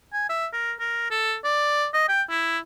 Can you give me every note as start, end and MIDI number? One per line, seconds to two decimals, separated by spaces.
0.13 0.26 80
0.29 0.46 76
0.53 0.73 70
0.80 1.09 70
1.10 1.36 69
1.44 1.87 74
1.94 2.07 75
2.08 2.22 79
2.30 2.58 64